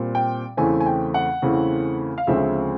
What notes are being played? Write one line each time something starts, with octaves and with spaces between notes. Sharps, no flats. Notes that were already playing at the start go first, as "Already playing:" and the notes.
Already playing: A#2 G3 C4
G5
E2 C#3 E3 A3 C4 G#5
G#5
G5
F#5
E2 C#3 E3 A3 C4
F5
D2 C#3 F3 G#3 C4 E5